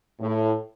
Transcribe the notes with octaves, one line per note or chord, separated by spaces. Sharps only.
A2